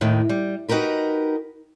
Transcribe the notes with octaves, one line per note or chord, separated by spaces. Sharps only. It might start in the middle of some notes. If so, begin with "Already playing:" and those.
D#2 A2 D#3
G3
D#4 F#4 G4 A#4 B4